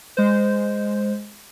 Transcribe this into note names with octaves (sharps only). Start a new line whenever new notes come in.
G#3 C5